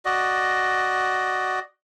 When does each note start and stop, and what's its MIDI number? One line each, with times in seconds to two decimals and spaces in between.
0.05 1.60 66
0.05 1.60 74
0.05 1.60 75